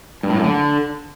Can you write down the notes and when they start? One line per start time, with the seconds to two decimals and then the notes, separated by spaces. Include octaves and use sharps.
0.23 G2
0.30 A2
0.37 F#2
0.43 D3